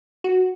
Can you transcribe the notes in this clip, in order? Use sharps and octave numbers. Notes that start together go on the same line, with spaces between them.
F#4